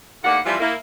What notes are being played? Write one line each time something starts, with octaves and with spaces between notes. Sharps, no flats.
D#2 A2 A#3 D5 F#5
E3 F3 G3 C4 E4 F4
A#3 E4